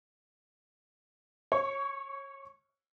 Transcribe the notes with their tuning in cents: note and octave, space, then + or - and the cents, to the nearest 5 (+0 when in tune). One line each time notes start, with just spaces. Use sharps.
C#5 -20 C#6 +20